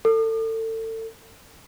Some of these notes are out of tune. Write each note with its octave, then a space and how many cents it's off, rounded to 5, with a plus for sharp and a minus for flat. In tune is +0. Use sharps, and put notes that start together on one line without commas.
A4 +30